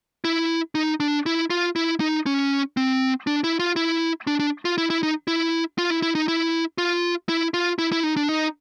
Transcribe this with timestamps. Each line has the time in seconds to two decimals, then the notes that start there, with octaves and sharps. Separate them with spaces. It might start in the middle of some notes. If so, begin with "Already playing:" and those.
0.25 E4
0.75 D#4
1.00 D4
1.26 E4
1.50 F4
1.76 E4
2.00 D#4
2.26 C#4
2.77 C4
3.27 D4
3.44 E4
3.60 F4
3.76 E4
4.27 D4
4.40 D4
4.65 F4
4.78 E4
4.90 E4
5.03 D#4
5.28 E4
5.78 F4
5.90 E4
6.02 E4
6.15 D#4
6.28 E4
6.78 F4
7.29 E4
7.54 F4
7.79 E4
7.92 E4
8.03 D#4
8.17 D4
8.29 D#4